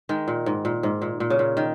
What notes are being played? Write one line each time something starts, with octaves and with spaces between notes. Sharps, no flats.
D#3 G#3
A#2
G#2
A#2
G#2
A#2
A#2
C#3
A#2
D#3